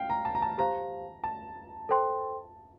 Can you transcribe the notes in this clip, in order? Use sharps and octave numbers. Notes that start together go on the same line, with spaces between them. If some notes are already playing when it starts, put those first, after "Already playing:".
Already playing: F5 G5
A#5
A5
A#5
A5
G4 C5 F5 A#5
A5
A4 C5 G5 C6